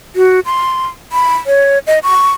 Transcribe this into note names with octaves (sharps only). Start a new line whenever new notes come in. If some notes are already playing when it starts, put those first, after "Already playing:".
F#4
C6
B5
C#5
D#5
C#6